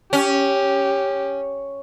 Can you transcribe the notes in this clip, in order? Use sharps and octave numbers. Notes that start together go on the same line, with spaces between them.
C#4 G4